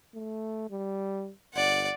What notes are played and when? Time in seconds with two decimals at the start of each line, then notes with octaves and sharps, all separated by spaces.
0.14 A3
0.70 G3
1.54 G1 D5 F#5